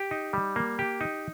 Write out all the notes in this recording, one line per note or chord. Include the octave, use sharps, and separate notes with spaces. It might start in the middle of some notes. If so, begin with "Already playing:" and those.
Already playing: G4
D#4
G3
A#3
G4
D#4